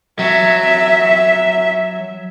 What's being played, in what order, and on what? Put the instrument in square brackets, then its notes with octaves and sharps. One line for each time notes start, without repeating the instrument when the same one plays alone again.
[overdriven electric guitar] F#3 [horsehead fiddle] E5